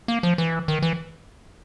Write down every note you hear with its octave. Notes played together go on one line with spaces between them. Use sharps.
A#3
F3
E3
D#3
E3